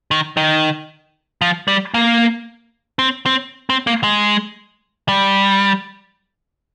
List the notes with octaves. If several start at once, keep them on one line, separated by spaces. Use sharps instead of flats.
D#3
D#3
F3
G3
A#3
C4
C4
C4
A#3
G#3
G3